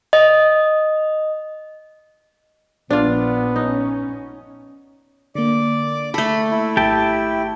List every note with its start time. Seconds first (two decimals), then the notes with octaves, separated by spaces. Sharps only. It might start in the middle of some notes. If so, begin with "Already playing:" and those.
0.13 D#5
2.90 A#1 B3 D4 F4
3.56 C#4 D#4
5.35 D3 A#3 D5
6.14 A3 A4 B5
6.51 E4
6.77 G#1 G4 G5 A5